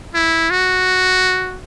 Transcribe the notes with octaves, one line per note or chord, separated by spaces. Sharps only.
E4
F#4